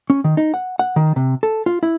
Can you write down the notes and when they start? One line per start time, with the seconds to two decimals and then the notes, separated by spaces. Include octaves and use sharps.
0.10 C#4
0.24 D#3
0.37 D#4
0.54 F#5
0.79 F#5
0.96 D#3
1.16 C3
1.43 A4
1.66 F4
1.83 E4